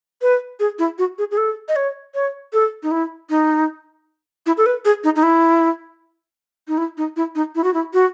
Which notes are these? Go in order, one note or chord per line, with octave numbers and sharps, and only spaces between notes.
B4
G#4
E4
F#4
G#4
G#4
A4
D#5
C#5
C#5
A4
D#4
E4
D#4
E4
A4
B4
G#4
D#4
D#4
E4
D#4
E4
D#4
E4
D#4
E4
F#4
E4
F#4